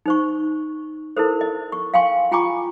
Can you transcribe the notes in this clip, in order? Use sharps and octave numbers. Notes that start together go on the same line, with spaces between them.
D#4 C5 C#6
E4 A4 A#4 C5
D#5
C#6
F5 G5 G#5 C6 C#6
F4 G5 G#5 A#5 C#6 D6